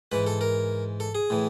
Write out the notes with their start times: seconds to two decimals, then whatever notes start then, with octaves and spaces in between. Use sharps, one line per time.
0.12 G#2 E3 B4
0.27 A4
0.41 A#4
1.00 A4
1.15 G#4
1.30 A2 E3